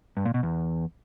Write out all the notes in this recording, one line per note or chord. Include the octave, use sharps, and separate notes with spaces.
G2
A#2
B2
E2